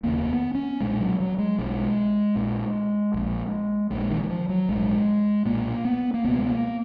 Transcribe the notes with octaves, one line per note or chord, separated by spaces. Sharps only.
F1 D#2 C#3 A#3
B3
C#4
B1 A#2 G#3
F#3
F#3
G#3
B1 B2 G#3
A#1 A#2
A#1 A#2
A#1 A#2 G#3
D#3
D#3
F3
F#3
A#1 G#2 G#3
B1 A#2 A#3
B3
A#3
C#2 B2 B3
G#3
A#3